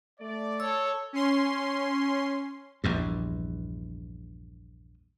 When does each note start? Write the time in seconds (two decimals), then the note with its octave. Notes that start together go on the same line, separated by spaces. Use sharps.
0.20 A3 D5
0.60 A4 C#5 E6
1.13 C#4 C6
2.84 A#1 E2 G2